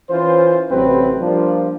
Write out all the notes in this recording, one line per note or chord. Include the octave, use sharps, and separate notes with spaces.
E3 C#4 F4 C5
A1 C3 F#3 C4 B4
F3 G3 A#3 D4 F4